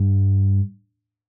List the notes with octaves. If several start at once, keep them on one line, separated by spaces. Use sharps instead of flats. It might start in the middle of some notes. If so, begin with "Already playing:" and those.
Already playing: G2